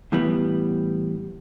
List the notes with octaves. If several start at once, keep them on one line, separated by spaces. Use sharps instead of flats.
A2 E3 G3 B3